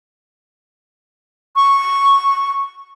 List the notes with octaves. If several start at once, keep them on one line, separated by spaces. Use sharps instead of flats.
C#6